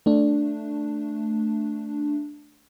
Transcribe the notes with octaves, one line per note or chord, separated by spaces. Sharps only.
A3 D4